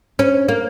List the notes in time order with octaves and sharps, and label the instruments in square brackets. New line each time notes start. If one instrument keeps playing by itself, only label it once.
[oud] C#4
A#3